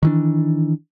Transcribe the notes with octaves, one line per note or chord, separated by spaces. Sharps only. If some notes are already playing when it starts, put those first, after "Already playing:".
D#3 E3 D4